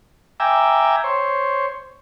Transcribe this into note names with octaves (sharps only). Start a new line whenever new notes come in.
E5 G5 G#5 A#5 D6 E6
C5 C#5